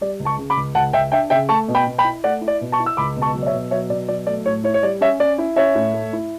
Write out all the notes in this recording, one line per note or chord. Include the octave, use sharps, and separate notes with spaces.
G3 D5
C#2
A5 C#6
C#3
B5 D6
C#2
C#2 F#5 A5
C#2 E5 G5
D4 E5 G5
C#3 E5 G5
A3 A5 C#6
B2
G5 B5
B2
G5 B5
E4
A3 D5 F#5
E4
D5
B2
A5 C#6
E4
E6
C#2 B5 D6
B2
A5 C#6
F#3
D5
C#5 E5
B2
F#3 C#5 E5
B2 D5
F#3 D5
A3 D5
A2 C#5
E4 C#5
C#5
G3 D5
C#4 C#5 E5
C#4 D5
E4
C#4 C#5 E5
A2
A3
E4